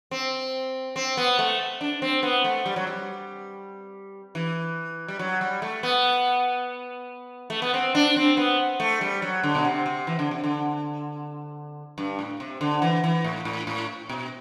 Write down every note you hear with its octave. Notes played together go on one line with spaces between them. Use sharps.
C4
C4
B3
A3
D4
C4
B3
A3
G3
F#3
G3
E3
G3
F#3
G3
A3
B3
A3
B3
C4
D4
C4
B3
A3
G3
F#3
D3
B2
C3
C3
E3
D3
C3
D3
G2
A2
C3
D3
E3
E3
A2
A2
A2
B2